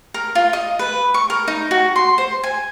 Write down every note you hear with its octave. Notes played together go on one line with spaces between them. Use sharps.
A#4
F4
D#5
B4
C#6
A#4
D#4
F#4
C6
C5
G#5